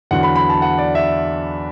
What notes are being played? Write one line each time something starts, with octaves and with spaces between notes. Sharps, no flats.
E2 D3 F#3 F#5
B5
B5
A5
F#5
D5
E5